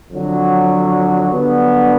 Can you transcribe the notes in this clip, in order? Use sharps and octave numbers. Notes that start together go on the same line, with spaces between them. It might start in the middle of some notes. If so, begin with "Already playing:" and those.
F2 D3 F#3
G2 D3 F#3 B3